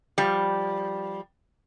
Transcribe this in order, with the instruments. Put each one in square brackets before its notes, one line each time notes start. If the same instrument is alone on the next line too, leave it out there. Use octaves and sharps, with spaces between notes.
[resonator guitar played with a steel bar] F3 G3